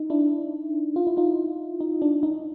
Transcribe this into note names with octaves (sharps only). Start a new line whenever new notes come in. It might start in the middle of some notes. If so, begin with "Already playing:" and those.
Already playing: D#4
D4 E4
F4
E4
D#4 F4
D#4
D4
D#4